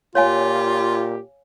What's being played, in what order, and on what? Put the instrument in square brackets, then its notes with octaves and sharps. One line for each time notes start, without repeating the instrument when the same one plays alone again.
[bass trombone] A#2 [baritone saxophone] F4 [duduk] G4 [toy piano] C#5 F5 G#5